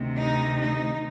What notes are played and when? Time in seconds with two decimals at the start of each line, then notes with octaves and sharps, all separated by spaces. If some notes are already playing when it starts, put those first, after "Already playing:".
Already playing: D2 C3 D#3
0.20 D#4
0.65 D#4